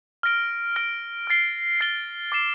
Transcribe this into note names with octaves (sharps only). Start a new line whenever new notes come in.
F6 A#6 D7 G7
F6 A#6 D7 G7
F6 A6 C7 G7
F6 A6 C7 G7
D6 A6 C7 E7